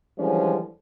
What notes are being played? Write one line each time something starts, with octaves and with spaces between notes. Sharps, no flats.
D3 E3 F3 G3 G#3 C#4